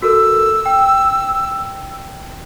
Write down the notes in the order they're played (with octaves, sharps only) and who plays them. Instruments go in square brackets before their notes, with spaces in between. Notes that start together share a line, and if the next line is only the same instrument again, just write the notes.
[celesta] F#4 A4 A#4 [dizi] E6
[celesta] G5